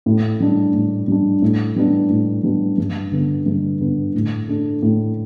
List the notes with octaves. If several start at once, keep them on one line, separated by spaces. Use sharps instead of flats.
A2
G3 D4
A2
G3 D4
A2
G3 B3 D4
A2
G3 B3 D4
G2
D3 B3
G2
D3 B3
A2
A3 D4
A2